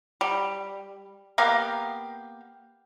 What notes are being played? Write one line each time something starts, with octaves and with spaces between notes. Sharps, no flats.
G3
A#3 B3 G4 F5